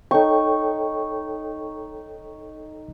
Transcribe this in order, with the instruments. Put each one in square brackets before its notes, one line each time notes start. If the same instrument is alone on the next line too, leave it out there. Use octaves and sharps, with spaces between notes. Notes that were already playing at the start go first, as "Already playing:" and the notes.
[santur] D#4 C#6 [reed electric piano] A4 C#5 G5